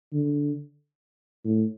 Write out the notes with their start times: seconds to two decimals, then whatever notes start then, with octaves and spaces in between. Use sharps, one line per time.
0.13 D3
1.44 A2